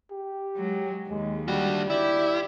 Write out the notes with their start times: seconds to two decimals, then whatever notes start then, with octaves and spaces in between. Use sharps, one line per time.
0.11 G4
0.56 F#3 G#3
1.09 D#2 G#3
1.48 D3 G3 F#4
1.90 E4 G4 D5